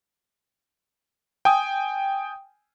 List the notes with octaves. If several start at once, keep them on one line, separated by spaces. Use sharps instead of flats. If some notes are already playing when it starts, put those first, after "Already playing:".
G5 G#5 D#6